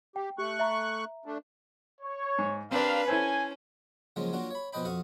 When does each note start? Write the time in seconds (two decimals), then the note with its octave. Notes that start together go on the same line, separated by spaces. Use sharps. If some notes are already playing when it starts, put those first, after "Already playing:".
0.16 G4 G5
0.38 A3 G4 C#6 F#6
0.60 E5 A#5
1.25 A3 D4
2.01 C#5
2.39 G#2
2.71 C4 D4 G4 A#4 B4 D5 F5
3.08 C#4 E4 A4 C5 G#5
4.16 C#3 F3 F#3 G#3 A#3 C#4
4.33 F#3 A#3 D4 F4 F#4
4.51 C#5 B5
4.73 B2 F3 B4 D#5 G5 B5
4.85 F2 F#4 F5 C#6 D#6